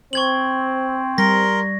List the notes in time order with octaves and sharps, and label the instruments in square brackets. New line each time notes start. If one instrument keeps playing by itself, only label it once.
[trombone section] C4 [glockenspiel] C#6 G#6 F#7
[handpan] G3 [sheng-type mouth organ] A#4 C6 [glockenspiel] A#6